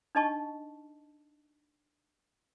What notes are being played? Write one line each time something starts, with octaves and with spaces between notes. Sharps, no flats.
D4 D#4 D#5 A5 C#6